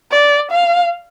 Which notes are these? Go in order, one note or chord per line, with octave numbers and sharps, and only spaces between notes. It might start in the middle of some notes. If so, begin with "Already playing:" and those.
D5
F5